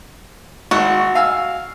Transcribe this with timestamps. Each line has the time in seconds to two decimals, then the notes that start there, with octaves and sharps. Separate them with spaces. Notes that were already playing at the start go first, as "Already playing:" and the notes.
0.71 G#1 F#4
1.15 F5 G#5 E6